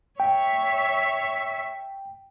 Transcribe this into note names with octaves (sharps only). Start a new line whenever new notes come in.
C#5 E5 G5